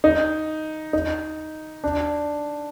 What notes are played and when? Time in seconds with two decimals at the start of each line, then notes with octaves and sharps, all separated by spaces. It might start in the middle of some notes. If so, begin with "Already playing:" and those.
0.04 D#4
0.93 D#4
1.84 D4